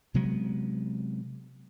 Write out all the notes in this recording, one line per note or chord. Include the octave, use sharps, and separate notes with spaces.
C3 F#3 G#3 B3